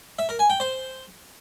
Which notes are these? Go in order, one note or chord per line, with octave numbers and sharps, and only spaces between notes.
E5
A#4
G#5
G5
C5